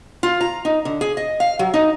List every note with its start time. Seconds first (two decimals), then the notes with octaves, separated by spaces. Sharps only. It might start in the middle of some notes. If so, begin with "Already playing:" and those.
0.23 F4
0.41 A#5
0.65 D#4
0.85 D3
1.01 G#4
1.17 D#5
1.40 F5
1.59 F#3
1.74 D#4